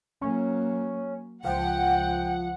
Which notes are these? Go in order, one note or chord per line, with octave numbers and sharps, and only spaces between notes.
F#3 A#3 C#4
C#2 F3 F#5 G5